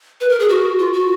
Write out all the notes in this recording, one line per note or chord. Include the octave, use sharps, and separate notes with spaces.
B4
A#4
G#4
F#4
F4
F#4